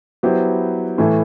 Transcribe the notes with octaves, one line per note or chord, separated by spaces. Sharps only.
F#3 B3 E4 G4 C5
A2 E3 A3